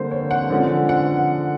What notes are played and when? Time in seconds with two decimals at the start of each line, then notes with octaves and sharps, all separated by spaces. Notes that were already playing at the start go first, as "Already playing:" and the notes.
Already playing: D3 G3 A#3 C5
0.11 C#5
0.31 F#5
0.50 D3 F3 G#3 C#4
0.89 F#5